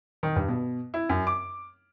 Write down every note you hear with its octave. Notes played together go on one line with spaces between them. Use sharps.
D#3
G2
B2
E4
F#2
D6